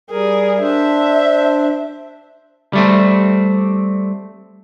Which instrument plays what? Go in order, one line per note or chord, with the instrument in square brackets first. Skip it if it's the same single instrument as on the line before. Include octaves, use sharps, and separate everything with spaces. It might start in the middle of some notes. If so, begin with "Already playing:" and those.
[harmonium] G3 A#4 [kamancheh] G#4
[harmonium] D4 C5 [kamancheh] E5
[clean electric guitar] G3 A3 C4